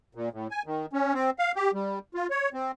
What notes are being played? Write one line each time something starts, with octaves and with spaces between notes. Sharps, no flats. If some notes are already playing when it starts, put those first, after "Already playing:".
A#2
A2
G#5
D#3
C#4
C4
F5
G4
G3
F4
C#5
C4